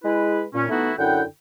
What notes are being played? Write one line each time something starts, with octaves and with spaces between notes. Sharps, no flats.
G#3 E4 B4
A#2 C#4
E3 A3 B3 D#4 E4 F#4
F#2 D3 E4 F#5 G5